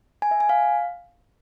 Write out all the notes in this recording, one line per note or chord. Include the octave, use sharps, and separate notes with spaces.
G#5
E5
G#5
F5